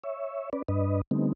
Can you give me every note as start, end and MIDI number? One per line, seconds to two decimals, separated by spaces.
0.04 0.50 73
0.04 0.50 76
0.53 0.62 61
0.53 0.62 71
0.53 0.62 74
0.68 1.01 43
0.68 1.01 62
0.68 1.01 71
0.68 1.01 75
1.11 1.33 50
1.11 1.33 55
1.11 1.33 57
1.11 1.33 59
1.11 1.33 60
1.11 1.33 63